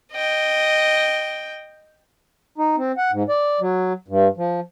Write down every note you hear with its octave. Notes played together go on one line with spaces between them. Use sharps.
D#5 G5
D#4
C4
F#5
G#2
D5
F#3
G2
F3